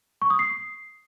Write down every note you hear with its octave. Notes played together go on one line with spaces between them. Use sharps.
C#6
D#6
C7